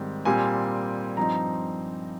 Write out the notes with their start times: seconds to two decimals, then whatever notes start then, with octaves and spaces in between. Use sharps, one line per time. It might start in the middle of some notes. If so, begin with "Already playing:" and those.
Already playing: G#2 D#3 G3 C4
0.25 A#2 G3 C4 G#5
1.17 G2 F3 C4 D#4 A#5